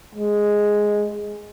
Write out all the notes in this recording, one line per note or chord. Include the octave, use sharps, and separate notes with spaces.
G#3